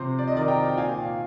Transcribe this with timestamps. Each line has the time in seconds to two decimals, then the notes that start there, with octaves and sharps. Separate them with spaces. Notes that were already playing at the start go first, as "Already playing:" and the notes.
Already playing: C3 F3 C5
0.18 D5
0.27 D#5
0.34 D#3 A#4 D5
0.48 G5 A#5
0.69 G5
0.76 A#2 F5 G#5